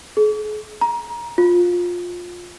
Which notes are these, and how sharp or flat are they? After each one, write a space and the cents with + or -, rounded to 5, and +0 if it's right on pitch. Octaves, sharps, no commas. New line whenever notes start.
G#4 +40
A#5 +20
F4 +15